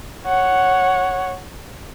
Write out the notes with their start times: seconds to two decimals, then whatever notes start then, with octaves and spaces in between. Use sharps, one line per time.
0.25 C#5 F#5